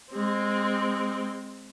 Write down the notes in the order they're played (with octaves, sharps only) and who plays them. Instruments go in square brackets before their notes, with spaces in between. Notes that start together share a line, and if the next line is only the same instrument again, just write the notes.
[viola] G#3 C4